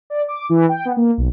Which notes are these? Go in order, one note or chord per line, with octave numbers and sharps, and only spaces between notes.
D5
D6
E3
G5
B3
A#3
B1